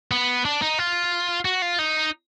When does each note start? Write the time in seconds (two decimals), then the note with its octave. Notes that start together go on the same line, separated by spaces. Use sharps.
0.11 B3
0.45 D4
0.62 D#4
0.79 F4
1.45 F#4
1.62 F4
1.79 D#4